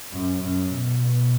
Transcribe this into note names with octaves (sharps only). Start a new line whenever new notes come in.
F#2
F#2
B2
B2